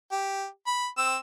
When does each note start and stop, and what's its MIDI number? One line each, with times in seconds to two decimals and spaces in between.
0.11 0.45 67
0.67 0.87 83
0.97 1.16 60
0.97 1.16 88